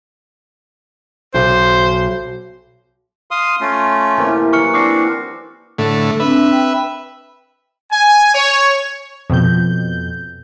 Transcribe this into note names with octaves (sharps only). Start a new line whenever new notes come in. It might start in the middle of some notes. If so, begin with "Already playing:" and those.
B1 C5
F5 C6 D#6
A3 C#4 F4
C3 E3 A#3
E3 F#3 C#6 F6 C#7
C4 D4 F#4 D6 C7
A2 D3 A3
C4 D4 B4 E5
G5
G#5
C#5
F2 B2 G6